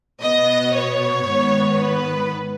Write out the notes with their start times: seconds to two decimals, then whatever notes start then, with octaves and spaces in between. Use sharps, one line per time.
0.22 B2 B3 D#5
0.75 C#5
1.27 G#2 D#3 B3
1.79 B4